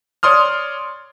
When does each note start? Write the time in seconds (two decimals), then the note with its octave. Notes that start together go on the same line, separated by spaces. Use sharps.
0.23 C#5 D5 C6 D#6 F6